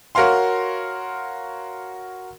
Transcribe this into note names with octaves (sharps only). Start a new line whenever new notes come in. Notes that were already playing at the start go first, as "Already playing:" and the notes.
F#4 A#4 C#5 F5 C6